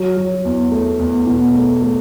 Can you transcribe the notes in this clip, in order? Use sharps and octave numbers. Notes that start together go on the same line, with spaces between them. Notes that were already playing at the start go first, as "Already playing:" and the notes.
Already playing: F#3
F#3
E2
A3
E2
B2
A3
A3